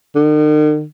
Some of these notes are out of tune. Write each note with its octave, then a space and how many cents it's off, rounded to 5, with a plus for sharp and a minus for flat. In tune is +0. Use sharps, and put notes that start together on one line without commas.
D#3 -45